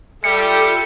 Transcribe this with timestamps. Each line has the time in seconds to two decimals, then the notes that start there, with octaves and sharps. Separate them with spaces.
0.24 G3 F4 G4 A4 E5 C#7